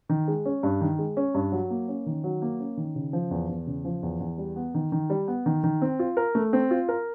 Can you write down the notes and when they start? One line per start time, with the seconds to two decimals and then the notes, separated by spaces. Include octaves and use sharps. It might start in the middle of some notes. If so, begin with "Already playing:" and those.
0.09 D#3
0.28 G#3
0.45 C#4
0.63 G2
0.81 D#3
0.99 G#3
1.17 C#4
1.34 G2
1.52 F#3
1.70 A#3
1.88 C#4
2.06 D#3
2.24 F#3
2.42 A#3
2.60 C#4
2.77 D#3
2.95 C#3
3.13 F3
3.31 E2
3.49 E2
3.67 C#3
3.85 F3
4.03 E2
4.20 E2
4.38 G3
4.56 B3
4.74 D#3
4.92 D#3
5.10 G3
5.28 B3
5.46 D#3
5.64 D#3
5.82 C4
5.99 F4
6.17 A#4
6.35 A3
6.53 C4
6.71 F4
6.89 A#4